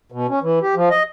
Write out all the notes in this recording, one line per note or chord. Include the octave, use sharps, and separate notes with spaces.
B2
C#4
E3
G4
F3
D#5